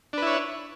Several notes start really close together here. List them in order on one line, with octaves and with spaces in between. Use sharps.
D4 B4 E4 C#5